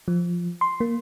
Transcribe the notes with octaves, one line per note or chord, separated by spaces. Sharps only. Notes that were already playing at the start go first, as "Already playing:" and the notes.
F3
C6
A#3